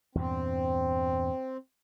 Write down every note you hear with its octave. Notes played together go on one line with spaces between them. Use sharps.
E2 G2 A#2 C4